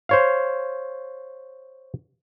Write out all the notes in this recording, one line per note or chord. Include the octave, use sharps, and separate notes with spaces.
C5 C#5 F5